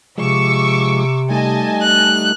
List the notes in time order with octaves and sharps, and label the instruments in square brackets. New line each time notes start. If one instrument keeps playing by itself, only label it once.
[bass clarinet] C3 [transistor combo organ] F3 G#3 [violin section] C#6 D6 E6
[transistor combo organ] G3 A3 D#4 [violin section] D#5 G#5 A5
[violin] F#6